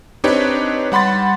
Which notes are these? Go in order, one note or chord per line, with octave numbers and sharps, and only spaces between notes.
C4 D4 D#4 G4 B4 C#5
G3 F#5 B5 C6 A6